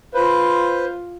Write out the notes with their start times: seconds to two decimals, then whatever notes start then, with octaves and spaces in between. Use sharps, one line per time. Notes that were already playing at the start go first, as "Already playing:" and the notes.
0.14 F4 B4 C5